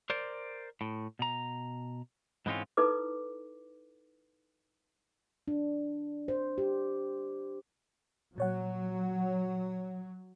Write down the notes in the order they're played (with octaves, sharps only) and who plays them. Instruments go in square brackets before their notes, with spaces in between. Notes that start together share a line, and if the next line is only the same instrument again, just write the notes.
[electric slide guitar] A#4 C5 D5
A2
B2 A#5
G#2 E3 G#3 C4 C#4 F4
[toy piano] D#4 E4 A4 B4 D6
[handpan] D4
C5
G4
[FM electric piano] A#2 C#5 F#5 [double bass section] F#3